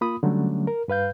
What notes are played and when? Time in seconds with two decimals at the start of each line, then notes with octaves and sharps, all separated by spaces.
0.01 A#3 F4 B5 D#6
0.23 D3 F#3 G3 A3 C#4
0.67 A#4
0.88 G2 B4 F5 G6